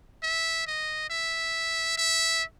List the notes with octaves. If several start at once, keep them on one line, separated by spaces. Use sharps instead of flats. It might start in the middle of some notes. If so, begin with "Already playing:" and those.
E5
D#5
E5
E5